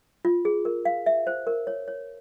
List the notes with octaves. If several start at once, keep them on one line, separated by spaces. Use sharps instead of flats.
F4
G#4
A#4
F5
E5
C5
A#4
C#5
C#5